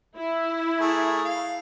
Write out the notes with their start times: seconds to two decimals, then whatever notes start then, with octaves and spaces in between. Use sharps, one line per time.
0.16 E4
0.79 A3 G#4 A#4
1.24 F5